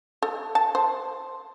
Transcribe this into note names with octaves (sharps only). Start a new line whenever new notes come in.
A4
A5
C5